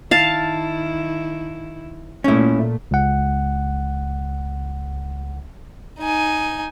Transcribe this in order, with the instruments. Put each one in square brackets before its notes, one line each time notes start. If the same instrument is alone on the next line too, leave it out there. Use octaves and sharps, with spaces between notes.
[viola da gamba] D#3 E4 [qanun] F5 A5
[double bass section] A#2 A3 [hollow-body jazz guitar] C#4 E4
[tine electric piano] C#2 F#5
[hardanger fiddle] D#4 G#5